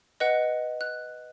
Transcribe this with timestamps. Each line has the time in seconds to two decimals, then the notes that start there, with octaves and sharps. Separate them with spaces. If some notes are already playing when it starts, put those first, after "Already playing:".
0.20 B4 D#5 F#5 F#6
0.81 F#6